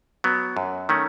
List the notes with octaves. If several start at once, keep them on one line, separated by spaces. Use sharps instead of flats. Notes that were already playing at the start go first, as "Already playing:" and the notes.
F#3 B3
F#2
D#3 A3 C#4